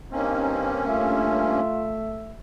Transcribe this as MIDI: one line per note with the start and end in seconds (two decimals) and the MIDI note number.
0.12 1.61 43
0.12 1.61 58
0.12 0.83 60
0.12 1.61 61
0.12 0.68 63
0.87 2.37 57
0.87 2.04 65
0.87 2.40 76